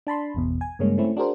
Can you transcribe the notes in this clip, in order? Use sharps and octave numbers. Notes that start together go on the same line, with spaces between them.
D4 A5 B5 C6
G#1 E2 B2
G#5
G2 C#3 G#3 A#3 C#4
A3 C4 C#4 E4
D4 F#4 G#4 A#4 C5